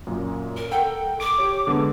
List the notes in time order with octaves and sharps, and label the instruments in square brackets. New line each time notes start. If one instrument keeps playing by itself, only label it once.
[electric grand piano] F#2 A#2
[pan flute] A#4
[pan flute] A4 [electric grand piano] A#4 F#5 G5
[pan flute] D6 [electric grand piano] D7
[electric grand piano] G4 C#5
D3 G#3 B3